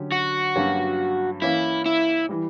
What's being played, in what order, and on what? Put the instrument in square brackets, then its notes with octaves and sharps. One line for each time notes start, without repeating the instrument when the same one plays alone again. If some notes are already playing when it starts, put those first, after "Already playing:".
Already playing: [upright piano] D3 F#3 C#4 G4
[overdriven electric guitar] F#4
[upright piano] G2 F#3 A#3 C#4 G4
[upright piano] E3 A#3 C#4 [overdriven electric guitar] E4
[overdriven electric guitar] E4
[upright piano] E3 G3